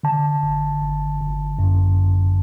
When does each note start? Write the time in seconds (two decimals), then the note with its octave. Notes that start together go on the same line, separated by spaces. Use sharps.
0.03 D3 A5
0.43 G1
0.82 G1
1.20 G1
1.59 F#2